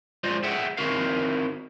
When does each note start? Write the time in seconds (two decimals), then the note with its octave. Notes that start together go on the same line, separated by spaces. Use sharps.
0.24 G#3 F4 C5 D5 D#5
0.43 G#4 A4 E5 F#5 G5
0.77 D#3 C4 E4 F#4 A#4 F5